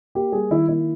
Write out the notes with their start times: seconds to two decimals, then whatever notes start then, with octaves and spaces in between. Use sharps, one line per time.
0.15 A#3 G4
0.32 G3 G#4
0.50 D#3 E4
0.68 A#3 E4